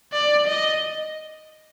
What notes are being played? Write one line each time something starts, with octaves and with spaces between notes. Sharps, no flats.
D5
D#5